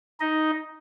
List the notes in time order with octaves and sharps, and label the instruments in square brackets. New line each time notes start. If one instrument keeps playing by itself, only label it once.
[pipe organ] D#4 D#5